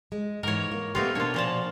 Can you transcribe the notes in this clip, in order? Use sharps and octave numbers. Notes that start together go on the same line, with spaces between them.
G#3
G#2 E3 A#4 C#5
A#3
A3 B3 C4 D#4 F4 G4
B2 A#3 D4 F4 C#5
A#2 F3 A5